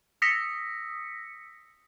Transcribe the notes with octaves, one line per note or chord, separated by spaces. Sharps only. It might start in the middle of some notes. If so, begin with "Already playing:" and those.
D#6 E6 A#6 B6 C#7